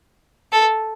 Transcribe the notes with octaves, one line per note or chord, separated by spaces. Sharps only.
A4